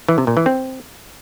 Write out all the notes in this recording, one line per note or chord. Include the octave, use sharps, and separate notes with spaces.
E3
C3
A#2
E3
C4